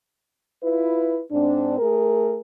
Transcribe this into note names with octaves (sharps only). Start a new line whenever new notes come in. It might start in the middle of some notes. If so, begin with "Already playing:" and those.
E4 F4 B4
G#2 C4 D4
A3 G#4 A#4